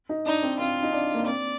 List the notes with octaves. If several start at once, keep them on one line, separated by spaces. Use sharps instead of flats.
D#4
D4 D#4
C4
C4 F4
D#4
D4
A#3
C4 D5